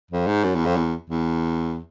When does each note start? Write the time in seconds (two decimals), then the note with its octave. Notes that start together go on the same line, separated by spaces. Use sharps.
0.11 F2
0.27 G#2
0.44 F#2
0.55 E2
0.66 F2
0.77 E2
1.09 E2